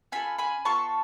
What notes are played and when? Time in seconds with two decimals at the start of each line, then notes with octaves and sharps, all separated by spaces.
0.12 C#4 F4 A4 G#5 B5
0.38 G#5 B5
0.65 B3 F4 A4 A5 C#6